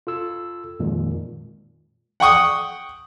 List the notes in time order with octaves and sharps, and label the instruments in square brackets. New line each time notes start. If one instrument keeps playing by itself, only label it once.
[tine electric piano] F4 A4 E6
F2 A#2 D#3 G#3
[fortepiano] F#5 G5 C#6 D#6